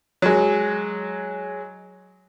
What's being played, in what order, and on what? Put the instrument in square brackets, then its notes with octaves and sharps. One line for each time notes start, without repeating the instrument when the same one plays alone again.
[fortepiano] F#3 G#3